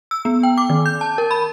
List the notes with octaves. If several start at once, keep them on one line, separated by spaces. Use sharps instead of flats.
E6
B3
G5
D6
D#3
G6
A5
A#4
B5